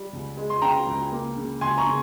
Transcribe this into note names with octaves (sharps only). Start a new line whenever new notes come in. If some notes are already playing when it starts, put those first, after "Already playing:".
Already playing: G3
C#2
G#3
C6
C#3 G5 A#5
C#2
A#3
C#3
C#2 G#5 C6
A#5 C#6
C#3